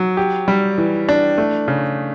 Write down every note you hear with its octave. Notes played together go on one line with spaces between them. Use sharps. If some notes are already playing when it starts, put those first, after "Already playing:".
Already playing: F#3
G4
G3
E3
D4
A3
C#3